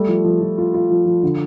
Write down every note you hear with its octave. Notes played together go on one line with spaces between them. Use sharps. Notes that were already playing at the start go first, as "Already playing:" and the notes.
Already playing: G3 A3
F3
F3
F3
F4
F4
F3
F3
D3